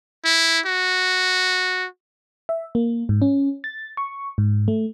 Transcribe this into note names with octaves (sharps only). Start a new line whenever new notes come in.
E4
F#4
E5
A#3
G#2
C#4
A6
C#6
G#2
A3